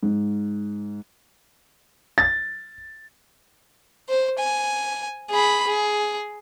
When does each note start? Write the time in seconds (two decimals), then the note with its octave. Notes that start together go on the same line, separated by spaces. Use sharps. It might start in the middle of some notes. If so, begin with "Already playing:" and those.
0.03 G#2
2.18 A6
4.09 C5
4.38 G#5
5.31 G#4 B5
5.67 G#4